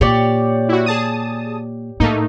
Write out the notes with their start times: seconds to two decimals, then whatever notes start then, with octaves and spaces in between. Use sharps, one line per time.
0.01 A#2 G4 C#5 D5
0.69 E4 F#4
0.86 G#4 A5 D#6
2.00 A2 A3 A#3 D#4